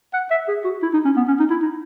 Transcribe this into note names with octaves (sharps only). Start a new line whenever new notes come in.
F#5
E5
G#4
F#4
E4
D#4
C#4
B3
C#4
D#4
E4
D#4